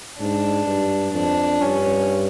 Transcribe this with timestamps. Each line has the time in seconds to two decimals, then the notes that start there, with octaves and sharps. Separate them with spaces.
0.20 G#2 D4
0.66 G2
1.14 F2 D4
1.61 G2 C#4